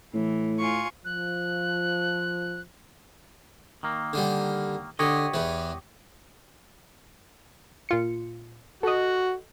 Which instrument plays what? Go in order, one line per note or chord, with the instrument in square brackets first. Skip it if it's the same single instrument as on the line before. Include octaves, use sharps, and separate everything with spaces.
[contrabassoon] A2 [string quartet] E3
[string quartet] F4 G#5 C#6
[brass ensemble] F3 [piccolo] F#6
[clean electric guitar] D#3 A#3
[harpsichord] D3 G3
[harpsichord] D3 [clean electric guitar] G4 C#5 D#5
[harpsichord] E2 E3
[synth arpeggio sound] A#2 F4 C#7
[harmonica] F#4 [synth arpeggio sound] A4 D#5